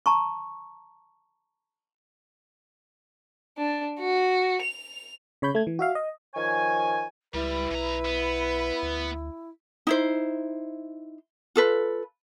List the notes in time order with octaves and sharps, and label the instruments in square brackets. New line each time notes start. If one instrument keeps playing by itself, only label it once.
[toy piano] A5 A#5 C#6
[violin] D4
F#4
F7
[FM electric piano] C#3 C#5 B5 G6
A3 G#6
E3
F#4 E5 F5
D#5
[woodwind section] D#3 F3 C#5 G#5
[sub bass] C#2 [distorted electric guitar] G3 [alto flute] E4 [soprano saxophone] B4
[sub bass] B1 [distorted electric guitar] E3 A#5
[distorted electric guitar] B3
[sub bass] D2
[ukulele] D#4 E4 C5
F4 A4 B4